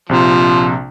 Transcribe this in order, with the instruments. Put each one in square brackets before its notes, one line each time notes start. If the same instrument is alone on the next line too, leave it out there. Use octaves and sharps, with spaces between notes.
[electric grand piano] A#1 C3 [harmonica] F3